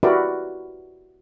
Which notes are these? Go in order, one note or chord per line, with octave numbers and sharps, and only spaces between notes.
E4 F#4 G4 A#4 B4 D5